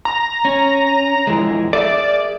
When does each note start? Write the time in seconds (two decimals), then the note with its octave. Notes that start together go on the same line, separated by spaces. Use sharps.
0.05 A#5
0.45 C#4
1.27 F2 E3 G#3
1.73 G#4 A#4 D5 E5